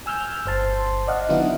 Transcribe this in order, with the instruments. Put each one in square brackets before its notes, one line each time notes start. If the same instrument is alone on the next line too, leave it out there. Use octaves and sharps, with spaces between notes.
[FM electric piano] G#5 E6 F6 G6
G1 C5 A5 C6
D5 D#5 F5 F#5
D3 D#3 F#3 B3 D#4 E4